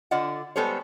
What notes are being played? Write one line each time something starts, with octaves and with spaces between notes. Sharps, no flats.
D3 F4 D5 D#5 F#5
G3 G#3 B3 A4 C5 C#5